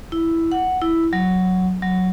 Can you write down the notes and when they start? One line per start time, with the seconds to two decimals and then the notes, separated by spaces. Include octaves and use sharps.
0.12 E4
0.52 F#5
0.82 E4
1.13 F#3
1.82 F#3